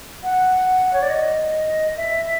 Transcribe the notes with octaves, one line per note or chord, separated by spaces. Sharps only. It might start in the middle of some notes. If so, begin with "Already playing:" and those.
F#5
C#5
D5
D#5
E5